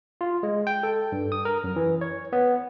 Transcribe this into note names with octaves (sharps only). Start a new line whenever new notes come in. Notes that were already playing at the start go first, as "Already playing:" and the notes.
F4
G#3
G5
A4
G2
D#6
A#4
F#2
E3
C#5
B3